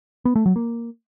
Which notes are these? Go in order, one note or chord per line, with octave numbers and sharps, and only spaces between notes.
B3
A3
F#3
A#3